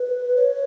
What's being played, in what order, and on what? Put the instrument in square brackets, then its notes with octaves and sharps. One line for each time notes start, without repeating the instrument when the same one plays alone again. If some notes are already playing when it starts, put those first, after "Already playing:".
Already playing: [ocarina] B4
C#5